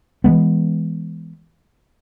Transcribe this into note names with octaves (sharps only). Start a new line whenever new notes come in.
E3 F#3 G#3 B3